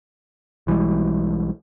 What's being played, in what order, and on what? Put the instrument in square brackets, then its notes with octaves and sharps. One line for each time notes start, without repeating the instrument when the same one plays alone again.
[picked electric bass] B1 E3 G3 G#3